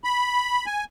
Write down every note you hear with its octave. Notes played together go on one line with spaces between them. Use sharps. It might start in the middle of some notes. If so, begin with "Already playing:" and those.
B5
G#5